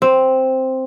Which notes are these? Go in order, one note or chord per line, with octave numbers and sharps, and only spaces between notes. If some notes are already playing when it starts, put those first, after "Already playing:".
C4